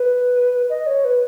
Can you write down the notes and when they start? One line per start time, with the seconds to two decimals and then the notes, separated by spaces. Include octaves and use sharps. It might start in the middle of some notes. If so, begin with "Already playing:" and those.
Already playing: B4
0.70 D#5
0.87 C#5
1.05 B4